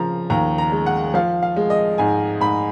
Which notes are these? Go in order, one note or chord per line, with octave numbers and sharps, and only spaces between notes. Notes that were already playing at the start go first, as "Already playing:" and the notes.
Already playing: C#3 F3 A#5
D#2 A#5
A#5
G#3
F#5
F3 F5
F5
G#3
D#5
G#2 G#5
G#2 B5